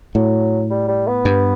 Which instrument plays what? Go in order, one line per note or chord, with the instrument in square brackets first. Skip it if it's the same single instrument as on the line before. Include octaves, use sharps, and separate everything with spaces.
[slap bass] A2 [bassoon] F#3
[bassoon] G3
G3
B3
[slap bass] G2